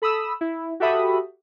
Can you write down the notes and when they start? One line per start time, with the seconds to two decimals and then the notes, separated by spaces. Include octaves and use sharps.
0.02 A4 B5 D#6 E6
0.41 E4
0.80 F#4 G4 A4 E5 B5 D#6